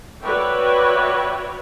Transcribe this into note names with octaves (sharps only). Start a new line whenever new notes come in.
F#4 B4 C#5 D5 E5 G5